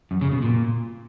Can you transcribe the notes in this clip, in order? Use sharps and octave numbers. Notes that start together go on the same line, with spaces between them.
F#2
C#3
B2
A#2